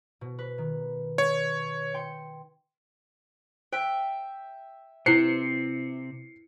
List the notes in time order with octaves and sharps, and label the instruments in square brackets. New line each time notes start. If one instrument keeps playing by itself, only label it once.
[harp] B2
B4
D#3
[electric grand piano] C#5
[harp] G5 C6 C#7
[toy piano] C5 [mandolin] E5 G5
[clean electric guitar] C3 C4 [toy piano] E4 B4 C5 [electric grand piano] C7 C#7